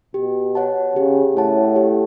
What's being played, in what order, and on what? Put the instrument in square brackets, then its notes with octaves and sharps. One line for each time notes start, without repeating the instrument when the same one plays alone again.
[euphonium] B2 [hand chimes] G4
[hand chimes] C#5 F#5 A5
[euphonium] C#3 [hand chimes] G4
[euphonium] A2 [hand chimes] C#5 F#5 A5
[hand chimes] G4